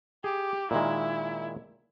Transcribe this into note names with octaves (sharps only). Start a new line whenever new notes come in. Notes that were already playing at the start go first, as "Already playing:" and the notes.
G4 G#4
A#2 D#3 G#3 E4